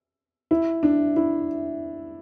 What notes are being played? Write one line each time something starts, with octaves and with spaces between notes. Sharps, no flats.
E4
D4
E4